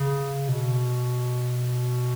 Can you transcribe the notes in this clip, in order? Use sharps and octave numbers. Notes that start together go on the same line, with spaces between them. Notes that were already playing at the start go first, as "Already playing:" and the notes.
Already playing: C#3
B2